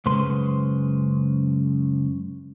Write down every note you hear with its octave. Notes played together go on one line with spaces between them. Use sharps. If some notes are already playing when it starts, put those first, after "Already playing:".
F#2 C#3 G#3 B4 C5 C6